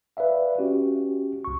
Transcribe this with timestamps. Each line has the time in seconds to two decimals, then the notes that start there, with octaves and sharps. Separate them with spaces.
0.17 B4 D5 E5 F5
0.58 C#4 F#4 G4
1.45 C2 C#6